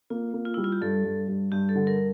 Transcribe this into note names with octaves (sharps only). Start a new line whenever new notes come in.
A#3 F4
A#3
F4
G3 E4
F4
G4
G2 A4
G2
G2
G2 G4
A4
D3
A#4